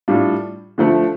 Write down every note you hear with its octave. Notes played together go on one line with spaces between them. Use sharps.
A2 G3 D4 F4
D3 F3 A3